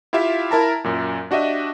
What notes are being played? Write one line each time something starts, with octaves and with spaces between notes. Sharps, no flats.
E4 F4 G4 E5 F5
E4 A#4 A5 A#5
F#2 A#2
D4 F#4 G4 D#5 E5